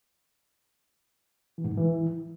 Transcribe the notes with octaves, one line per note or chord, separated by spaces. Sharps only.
E3
G#2
E2
E3